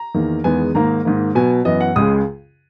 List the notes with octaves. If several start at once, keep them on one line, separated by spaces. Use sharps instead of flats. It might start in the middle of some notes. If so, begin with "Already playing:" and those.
Already playing: A#5
E2 D#3 A#3
E2 D#3 G#3 B3 G#5
G#2 D#3 A#3 A#5
G#2 D#3 A#3
B2 F#3 B3 G#5
F#2 E3 B3 D#5
F#5
C#2 C#3 G#3 D#6